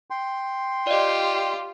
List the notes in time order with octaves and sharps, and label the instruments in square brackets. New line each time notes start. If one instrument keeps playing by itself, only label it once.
[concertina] G5 C6
[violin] F4 G4 [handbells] D5 D#5